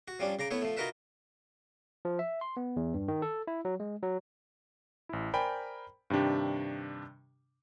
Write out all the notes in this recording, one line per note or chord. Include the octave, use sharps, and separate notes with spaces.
F#4
F3 G3 C#4 D4
C#3 A#5 D6
A3 B3 E4 C#5
F3 A3
D#4 F4 F#4 A#4 B4 E5
F3
E5
C6
B3
E2
G2
D#3
A4
E4
F#3
G#3
F#3
A1 E4
A#4 C5 D5 G5 G#5 B5
G2 C3 D#3 D4 G4